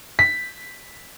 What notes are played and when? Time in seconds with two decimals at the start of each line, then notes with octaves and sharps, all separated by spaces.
0.19 B6